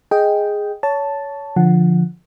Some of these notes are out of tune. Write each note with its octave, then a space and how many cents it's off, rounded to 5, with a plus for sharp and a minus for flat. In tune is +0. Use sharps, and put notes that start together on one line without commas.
G#4 +0 D#5 +5 G5 +0
C#5 +20 A5 +0
D3 +0 F3 +0 F#5 -5